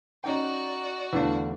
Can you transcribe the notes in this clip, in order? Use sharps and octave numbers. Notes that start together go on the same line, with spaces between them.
C#4 D#4 F#4 D5 G5
E2 D3 E3 A3 D4 F5